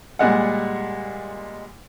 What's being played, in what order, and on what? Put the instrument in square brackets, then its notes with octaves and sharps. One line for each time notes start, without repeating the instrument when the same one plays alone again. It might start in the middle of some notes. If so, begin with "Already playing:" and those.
[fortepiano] A#2 G3 G#3 F#5